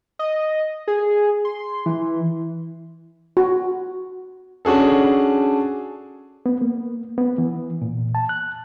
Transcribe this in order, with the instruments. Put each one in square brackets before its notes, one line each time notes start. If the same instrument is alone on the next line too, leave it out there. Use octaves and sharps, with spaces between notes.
[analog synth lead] D#5
G#4
C6
E3
[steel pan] F#4
[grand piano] C#4 D4 F#4 G#4 A4
[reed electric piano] B3
A#3
B3
E3
A#2
A5
F#6